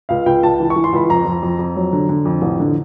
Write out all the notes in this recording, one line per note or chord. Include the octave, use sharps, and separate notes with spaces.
C#2 F5
C#2 G5
C#2 A5
E3
C#6
E3
C6
C#2 B5
F2 A#5
F2
F2
F2
F#3
D3
D3
F2
A1
D3